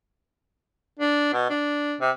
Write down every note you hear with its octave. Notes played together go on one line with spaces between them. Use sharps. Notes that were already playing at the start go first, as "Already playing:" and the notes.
D4
B2
D4
C3